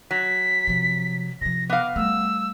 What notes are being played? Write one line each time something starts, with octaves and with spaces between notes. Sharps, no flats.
F#3 B6
C3 F3
C3 F3 A#6
B3 F5 D6
G3 A3 E6